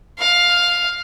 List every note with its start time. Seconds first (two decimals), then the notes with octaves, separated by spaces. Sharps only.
0.19 F5